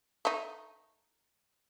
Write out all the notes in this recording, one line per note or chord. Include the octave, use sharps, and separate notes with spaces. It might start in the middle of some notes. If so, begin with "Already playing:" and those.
A3 D#4